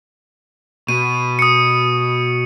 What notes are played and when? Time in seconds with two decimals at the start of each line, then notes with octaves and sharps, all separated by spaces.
0.88 B2 D#7
1.39 D#6 C#7